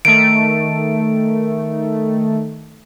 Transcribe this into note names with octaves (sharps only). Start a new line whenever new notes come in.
D#3 A3 D7